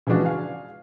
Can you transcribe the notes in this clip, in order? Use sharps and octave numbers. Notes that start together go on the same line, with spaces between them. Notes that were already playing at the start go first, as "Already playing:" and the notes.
C#3 E3 F3 G#3 D4 F#4
F5 G#5